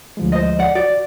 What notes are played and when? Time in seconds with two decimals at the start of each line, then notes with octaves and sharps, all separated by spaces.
0.17 D2 F3 G#3
0.32 C5 D#5
0.59 D5 F#5
0.75 F#4 D5